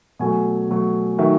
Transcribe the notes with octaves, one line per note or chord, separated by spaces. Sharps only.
B2 F#3 A3 G#5
B2 F#3 A3
D#3 F#3 A3 E5